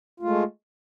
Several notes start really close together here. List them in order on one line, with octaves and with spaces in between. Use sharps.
F4 A3 G#3